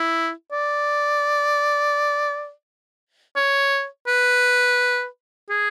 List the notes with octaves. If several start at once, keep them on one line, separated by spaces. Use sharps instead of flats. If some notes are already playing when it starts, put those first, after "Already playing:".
Already playing: E4
D5
C#5
B4
G#4